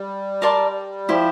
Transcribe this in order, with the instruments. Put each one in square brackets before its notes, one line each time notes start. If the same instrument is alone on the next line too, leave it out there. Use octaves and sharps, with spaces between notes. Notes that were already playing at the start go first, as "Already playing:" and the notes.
Already playing: [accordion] G3
[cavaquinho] A#4 D5 A5 C6
[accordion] F3 [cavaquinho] E4 G4 C5